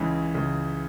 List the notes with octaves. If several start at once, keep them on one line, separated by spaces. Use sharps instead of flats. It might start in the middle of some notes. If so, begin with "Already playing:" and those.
Already playing: C#2 C#3 E3
C#2 C#3 E3